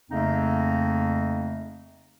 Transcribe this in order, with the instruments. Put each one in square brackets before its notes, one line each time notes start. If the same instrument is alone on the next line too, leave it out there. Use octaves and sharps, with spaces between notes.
[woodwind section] F2 C#3 A3 A#3 C4 D#4